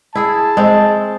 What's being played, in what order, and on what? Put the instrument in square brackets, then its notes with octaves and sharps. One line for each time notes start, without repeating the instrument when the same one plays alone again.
[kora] E4 G#4 [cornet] A5
[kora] G#3 C4